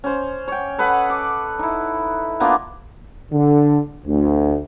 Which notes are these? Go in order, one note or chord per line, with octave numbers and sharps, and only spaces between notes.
C#4 C5
C#5 G5
A4 B4 D#5 F#5
D6
D#4 E4
A#3 B3 D4 F4
D3
D2